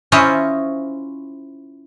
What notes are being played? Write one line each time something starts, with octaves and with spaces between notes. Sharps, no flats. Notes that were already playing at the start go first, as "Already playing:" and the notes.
C#4 E4 F4 C5 C#5 D#5